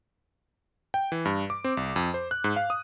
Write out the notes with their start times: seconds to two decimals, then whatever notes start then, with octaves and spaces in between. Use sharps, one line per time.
0.94 G5
1.12 E3
1.25 G2
1.50 D6
1.64 C4
1.77 C2
1.96 F2
2.14 C5
2.31 F#6
2.44 G#2
2.56 F5
2.70 D#6